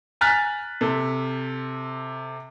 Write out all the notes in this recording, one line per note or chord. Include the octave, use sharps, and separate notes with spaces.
G#5 A#5 F6 F#6 A6 B6
C3 A4